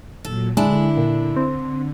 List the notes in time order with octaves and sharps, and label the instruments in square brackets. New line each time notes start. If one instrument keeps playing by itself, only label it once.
[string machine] A#2 F#3 [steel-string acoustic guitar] A4
[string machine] D3 [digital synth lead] G#3 [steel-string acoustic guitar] D4 E4
[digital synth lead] A#2
C4